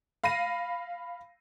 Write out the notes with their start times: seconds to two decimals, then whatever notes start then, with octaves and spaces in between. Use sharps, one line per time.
0.24 F5 B5 A#6 C7 D#7